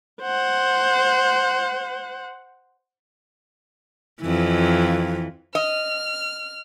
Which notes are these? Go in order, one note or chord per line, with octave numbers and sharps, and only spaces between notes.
C5 F#5
F2 E3
D#5 F6